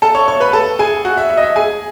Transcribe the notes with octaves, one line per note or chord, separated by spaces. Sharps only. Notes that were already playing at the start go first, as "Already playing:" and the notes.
A4 A5
C#5 C#6
C#5 C#6
B4 B5
A4 A5
G#4 G#5
F#4 F#5
E5
E5
D#5
E5
G#4 G#5